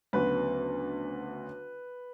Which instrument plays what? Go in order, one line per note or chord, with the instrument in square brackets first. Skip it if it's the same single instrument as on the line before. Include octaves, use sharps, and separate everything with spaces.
[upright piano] D2 C#3 F#3 B3 [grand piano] B4